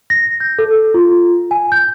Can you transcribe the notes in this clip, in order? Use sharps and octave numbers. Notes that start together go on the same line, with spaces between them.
A#6
G6
A4
F4
G#5
G6